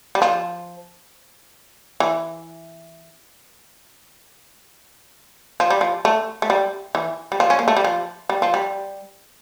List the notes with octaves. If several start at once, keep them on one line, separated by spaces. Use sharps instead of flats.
G3
F3
E3
F3
G3
F3
A3
A3
G3
E3
G3
F3
C#4
A#3
A3
G3
F3
G3
F3
G3